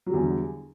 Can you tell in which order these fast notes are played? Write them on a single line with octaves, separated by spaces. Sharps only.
F#3 G3 E2 D3